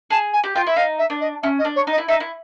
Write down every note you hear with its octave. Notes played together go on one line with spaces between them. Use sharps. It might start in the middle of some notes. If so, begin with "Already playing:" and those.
G#4 A5
G#5
G4
F4 G5
E4 E5
D#4 F5
E5
D4
D#5
C#4 E5
D#5
D4
C#5
D#4 D#5
E4
D#4 E5
E4